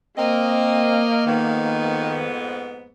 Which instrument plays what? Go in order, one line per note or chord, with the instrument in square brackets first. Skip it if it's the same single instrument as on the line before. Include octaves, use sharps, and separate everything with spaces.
[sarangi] A#3 [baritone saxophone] C4 [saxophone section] A#4 D#5
[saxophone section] F2 G#2 B3 [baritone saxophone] D#3